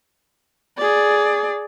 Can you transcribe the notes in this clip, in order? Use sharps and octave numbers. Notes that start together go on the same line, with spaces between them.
G#4 D5